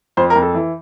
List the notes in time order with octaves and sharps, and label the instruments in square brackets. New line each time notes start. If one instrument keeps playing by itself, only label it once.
[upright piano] F2 C5
A#4
F2
A4
E3